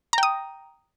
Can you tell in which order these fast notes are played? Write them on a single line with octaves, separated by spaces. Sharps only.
A#5 G5 D#6